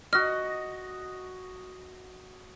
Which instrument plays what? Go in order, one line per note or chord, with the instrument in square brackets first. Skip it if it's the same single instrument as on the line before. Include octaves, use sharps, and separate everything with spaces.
[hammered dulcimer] F#4 D#5 [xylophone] F6